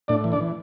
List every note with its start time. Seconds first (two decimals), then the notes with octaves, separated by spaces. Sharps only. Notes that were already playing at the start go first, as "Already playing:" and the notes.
0.08 A2 D4 D5
0.24 E3
0.32 D4 D5
0.41 E3